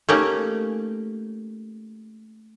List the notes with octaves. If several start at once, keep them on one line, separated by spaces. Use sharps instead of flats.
A3 A#3 C#4 D#4 G4